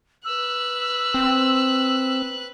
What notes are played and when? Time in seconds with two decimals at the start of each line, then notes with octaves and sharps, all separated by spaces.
0.25 B4 E6 F#6
1.14 C4